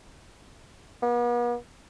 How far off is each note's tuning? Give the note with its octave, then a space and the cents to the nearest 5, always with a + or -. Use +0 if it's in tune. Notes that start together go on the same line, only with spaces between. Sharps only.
B3 -45